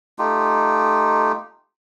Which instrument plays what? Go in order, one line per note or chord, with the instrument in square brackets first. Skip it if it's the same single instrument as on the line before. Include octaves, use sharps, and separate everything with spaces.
[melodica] A3 D#4 F4 G4